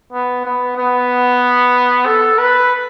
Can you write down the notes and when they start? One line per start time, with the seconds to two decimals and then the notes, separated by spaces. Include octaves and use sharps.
0.12 B3
0.45 B3
0.77 B3
2.06 A4
2.38 B4